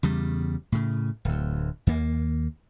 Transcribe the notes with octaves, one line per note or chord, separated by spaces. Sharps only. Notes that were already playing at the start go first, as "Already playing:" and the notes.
E2 C#3 G3
A2 C#3
D1 D2
D#2 A#3